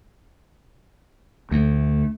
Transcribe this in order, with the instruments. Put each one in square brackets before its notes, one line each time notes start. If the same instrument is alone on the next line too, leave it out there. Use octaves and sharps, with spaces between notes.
[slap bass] D2 [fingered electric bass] A3